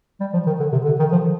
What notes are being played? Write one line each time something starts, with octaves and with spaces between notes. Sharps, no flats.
G3
F3
D#3
D3
C3
D3
D#3
F3